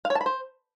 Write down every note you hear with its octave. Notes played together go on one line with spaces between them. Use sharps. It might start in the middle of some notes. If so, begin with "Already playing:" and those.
F5
C#5
A5
B5
C5